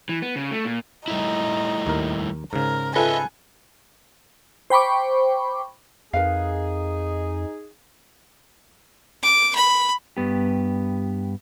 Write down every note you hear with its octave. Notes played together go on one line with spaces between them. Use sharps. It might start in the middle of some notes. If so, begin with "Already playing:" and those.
E3
B3
C#3
A3
A#2
G3 A3 D#4 E4
D#2 A#4
G#2 C#3 A#4
F4 A4 B4 D#5 E5 G#5
C5 G5 B5 C#6 D6
F2 D#4 G#4 A#4 B4 F5
D6
B5
G2 B3 G4